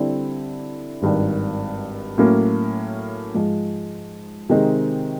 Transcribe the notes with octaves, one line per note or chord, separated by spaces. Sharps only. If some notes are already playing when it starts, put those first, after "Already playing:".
Already playing: D3 G3 C4 E4
G#1 G2 D#3
A2 F#3 A#3 C#4
G#2 F3 G#3
C3 D#3 G#3 C4 D#4